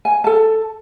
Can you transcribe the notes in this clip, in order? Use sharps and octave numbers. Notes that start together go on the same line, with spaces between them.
G#5
A4 A5